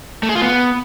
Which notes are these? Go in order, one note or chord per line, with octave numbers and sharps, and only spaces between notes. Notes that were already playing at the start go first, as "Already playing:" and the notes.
A3
G#4
F4
B3